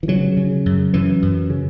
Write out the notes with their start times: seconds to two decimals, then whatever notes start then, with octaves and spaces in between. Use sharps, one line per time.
0.03 E3
0.08 C#3 F#3
0.37 C#3
0.66 F#2
0.93 F#2 E3
1.22 F#2
1.50 C#3